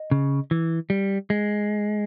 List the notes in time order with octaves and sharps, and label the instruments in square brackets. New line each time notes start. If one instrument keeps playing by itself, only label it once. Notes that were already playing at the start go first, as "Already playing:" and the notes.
Already playing: [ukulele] D#5
[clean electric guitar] C#3
E3
G3
G#3